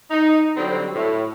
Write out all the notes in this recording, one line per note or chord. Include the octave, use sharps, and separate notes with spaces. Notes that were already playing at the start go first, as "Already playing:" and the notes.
D#4
D3 F#3 G3 C4
A2